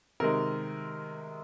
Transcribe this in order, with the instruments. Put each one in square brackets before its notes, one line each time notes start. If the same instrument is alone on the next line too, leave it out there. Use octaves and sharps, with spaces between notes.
[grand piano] C3 D#3 G#3 A#4